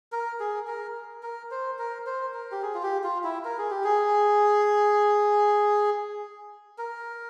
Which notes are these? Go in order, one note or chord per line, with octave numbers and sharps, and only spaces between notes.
A#4
G#4
A#4
A#4
C5
A#4
C5
A#4
G4
G#4
F4
G4
F4
E4
A#4
G#4
G4
G#4
A#4